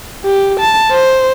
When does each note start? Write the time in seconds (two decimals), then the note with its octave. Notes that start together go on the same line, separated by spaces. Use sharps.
0.25 G4
0.60 A5
0.91 C5